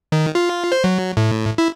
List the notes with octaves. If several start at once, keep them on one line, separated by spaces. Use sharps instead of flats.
D#3
F4
C5
F#3
A2
E4